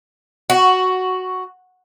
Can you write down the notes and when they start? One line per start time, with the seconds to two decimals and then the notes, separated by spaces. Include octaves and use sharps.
0.50 F#4